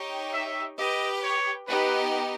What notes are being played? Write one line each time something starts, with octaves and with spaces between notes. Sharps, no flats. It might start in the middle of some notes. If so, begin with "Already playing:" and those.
Already playing: D#4 G4 C#5 G5
E5
G4 B4 D#5 G5
C#5
B3 D#4 G4 B4